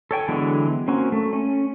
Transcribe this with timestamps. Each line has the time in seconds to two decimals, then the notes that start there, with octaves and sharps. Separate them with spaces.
0.11 A4 C#5 G5 G#5
0.28 D3 E3 F#3 G#3 B3
0.88 A#3 C4 C#4 F#4
1.12 A3
1.33 C#4